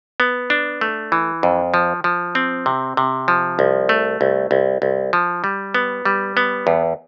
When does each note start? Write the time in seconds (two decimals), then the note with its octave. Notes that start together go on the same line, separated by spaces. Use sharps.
0.20 B3
0.50 D4
0.81 A3
1.12 E3
1.43 F2
1.74 F3
2.04 F3
2.35 C4
2.66 C3
2.97 C3
3.28 F3
3.59 C2
3.89 A3
4.21 C2
4.51 C2
4.82 C2
5.13 F3
5.44 G3
5.75 B3
6.05 G3
6.37 B3
6.67 E2